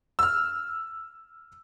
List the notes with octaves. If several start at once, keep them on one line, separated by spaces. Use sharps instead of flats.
E6 F6